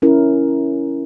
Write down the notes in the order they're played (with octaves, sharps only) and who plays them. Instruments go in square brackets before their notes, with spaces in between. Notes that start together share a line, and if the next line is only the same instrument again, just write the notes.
[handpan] C#4 E4 A#4